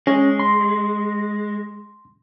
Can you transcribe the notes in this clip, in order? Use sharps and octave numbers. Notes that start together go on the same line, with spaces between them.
G#3 C#4
C6